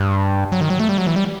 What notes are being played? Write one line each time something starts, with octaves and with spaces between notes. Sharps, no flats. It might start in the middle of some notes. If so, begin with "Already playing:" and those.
Already playing: G2
F#3
D#3
F#3
A3
G3
F#3
E3
G3